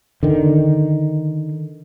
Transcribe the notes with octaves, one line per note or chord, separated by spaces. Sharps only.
D3 D#3